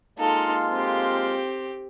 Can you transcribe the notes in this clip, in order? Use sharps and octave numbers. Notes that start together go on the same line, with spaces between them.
G#3 A#3 D#4 F4 A4
C4 G4